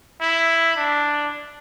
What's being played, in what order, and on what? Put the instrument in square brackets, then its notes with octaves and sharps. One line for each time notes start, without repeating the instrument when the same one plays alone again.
[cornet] E4
D4